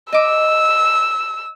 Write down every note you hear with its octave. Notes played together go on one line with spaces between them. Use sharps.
D#5 D6 E6